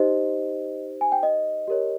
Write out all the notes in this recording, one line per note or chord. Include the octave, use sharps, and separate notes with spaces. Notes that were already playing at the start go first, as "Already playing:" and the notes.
Already playing: D#4 G4 C5 D#5
G#5
G5
D#5
G4 A#4 C#5